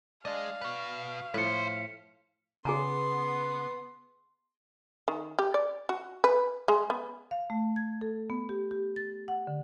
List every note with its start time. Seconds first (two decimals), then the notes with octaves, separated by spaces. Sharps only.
0.25 D4 G#4 D#5 F5
0.61 F#4 B4
1.34 A2 F3 B4 C6 B6 C#7
2.65 C#3 B3 G#4 G#5 A#5 C6
5.08 D#3
5.39 G4
5.54 D5
5.89 F#4
6.24 B4
6.68 G#3
6.90 B3
7.31 F5
7.50 A3
7.76 G#6
8.01 A4
8.30 B3
8.49 G4
8.71 G4
8.96 A6
9.28 F#5
9.47 D3